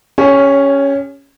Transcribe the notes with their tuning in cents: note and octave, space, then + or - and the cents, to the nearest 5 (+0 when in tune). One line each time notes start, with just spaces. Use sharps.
C#4 +5 G4 +40 C#5 +25